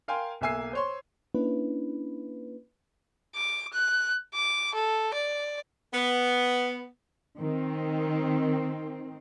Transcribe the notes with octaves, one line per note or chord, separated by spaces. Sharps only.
A#4 F5 G5 G#5 C6
B1 A#3 E5 G#5 E6 C7
C5 C#5 C6
A#3 C#4 D4 E4 B4
D6
F#6
D6
A4
D5
B3
D#3 C4